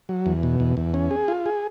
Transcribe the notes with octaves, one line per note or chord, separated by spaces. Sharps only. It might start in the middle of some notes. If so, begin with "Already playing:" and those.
F#3
E2
B2
E2
E2
C#4
G#4
F4
G#4